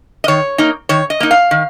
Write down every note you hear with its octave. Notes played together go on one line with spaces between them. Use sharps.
D#5
D#3 C#5
A#3 D#4
D#3 C#5
D#5
A#3 D#4
F5
D#3